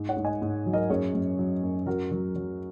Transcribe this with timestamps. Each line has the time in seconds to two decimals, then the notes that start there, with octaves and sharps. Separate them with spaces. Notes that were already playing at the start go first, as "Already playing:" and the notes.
Already playing: G#2
0.09 C#5 F#5
0.16 G#2
0.24 D#5 G#5
0.42 G#2
0.66 F#3
0.73 A#4 D#5
0.90 F#2 G#4 C#5
1.14 F#2
1.38 F#3
1.63 F#2
1.86 F#3 F#4 A#4
2.11 F#3
2.35 F#3